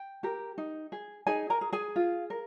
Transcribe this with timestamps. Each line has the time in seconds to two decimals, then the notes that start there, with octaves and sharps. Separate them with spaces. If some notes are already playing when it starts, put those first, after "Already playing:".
Already playing: G5
0.23 G4 A#4
0.58 D#4
0.92 G#4
1.27 D#4 G#4 G#5
1.50 A#4 A#5
1.61 G#4
1.73 G#4 G#5
1.96 F4
2.30 A#4